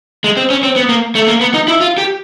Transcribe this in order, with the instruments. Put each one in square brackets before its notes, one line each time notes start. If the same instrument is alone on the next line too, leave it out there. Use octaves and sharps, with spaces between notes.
[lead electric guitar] G#3
C4
C#4
C4
B3
A#3
A3
A#3
B3
D#4
E4
F4
G4